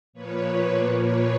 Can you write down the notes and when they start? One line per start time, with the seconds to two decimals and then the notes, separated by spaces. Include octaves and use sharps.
0.13 A#2 F3 A#3 B4 C#5
1.02 B4 C#5